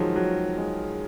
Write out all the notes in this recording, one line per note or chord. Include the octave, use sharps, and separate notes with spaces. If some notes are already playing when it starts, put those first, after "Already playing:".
Already playing: D#3 F3 F#3 G#3
F#3
G#3